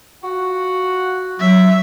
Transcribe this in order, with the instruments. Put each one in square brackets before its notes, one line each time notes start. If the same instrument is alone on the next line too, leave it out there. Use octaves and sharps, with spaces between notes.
[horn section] F4 F#4 F#5
[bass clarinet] F#3 [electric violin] E5